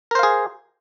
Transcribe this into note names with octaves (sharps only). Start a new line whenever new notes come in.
G#4 A#4 C5 F5